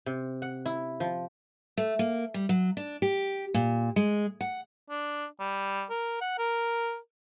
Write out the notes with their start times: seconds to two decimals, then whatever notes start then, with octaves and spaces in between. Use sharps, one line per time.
0.06 C3
0.42 F#5
0.66 E4
1.00 F3
1.77 A3
1.99 A#3
2.34 G3
2.49 F#3
2.77 D4
3.02 G4
3.54 A#2
3.96 G#3
4.41 F#5
4.90 D4
5.40 G3
5.90 A#4
6.21 F#5
6.39 A#4